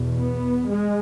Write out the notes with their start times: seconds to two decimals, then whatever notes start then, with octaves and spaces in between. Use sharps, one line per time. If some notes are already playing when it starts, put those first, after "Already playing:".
Already playing: E2 B2
0.21 B3
0.71 G#3